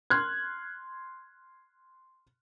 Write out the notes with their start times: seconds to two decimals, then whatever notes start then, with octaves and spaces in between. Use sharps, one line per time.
0.10 C6 F6 F#6 G#6